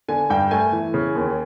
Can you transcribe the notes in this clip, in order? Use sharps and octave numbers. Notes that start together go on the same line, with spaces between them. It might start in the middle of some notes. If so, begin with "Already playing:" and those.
D3 G#5
G2 G5
A3 G#5
E3
C#3
D#2